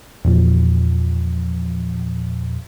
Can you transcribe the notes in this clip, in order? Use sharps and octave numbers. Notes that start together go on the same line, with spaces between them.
E2 A#2 F3